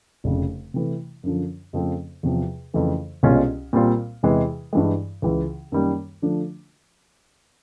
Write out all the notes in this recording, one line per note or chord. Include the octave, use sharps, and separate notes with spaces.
F1 F2 C#3
C3 E3 A3
F#2 D3 F3
F2 C#3 F3 A3 C4
E2 C3 F3
F2 C#3 E3 A3
C2 B2 G#3 C#4 F4
A#2 G3 C4 F4
E2 C3 E3 G#3
G2 E3 G#3
C#2 C#3 E3
F#2 D#3 G3 A#3
D3 F3 A3 D4